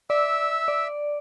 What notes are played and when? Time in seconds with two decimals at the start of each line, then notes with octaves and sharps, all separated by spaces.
0.10 D5 E5 E6
0.68 D5